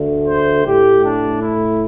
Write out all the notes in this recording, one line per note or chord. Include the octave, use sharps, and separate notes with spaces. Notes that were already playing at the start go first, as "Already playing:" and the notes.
Already playing: D2 D3 A3
C5
A2 A3 G4
D4
E4